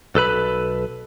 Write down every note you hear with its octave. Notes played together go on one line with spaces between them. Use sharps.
B1 A4 B4 B5